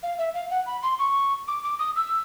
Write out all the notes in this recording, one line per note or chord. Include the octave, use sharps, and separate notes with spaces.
F5
E5
F5
F#5
B5
C6
C#6
D6
D6
D#6
E6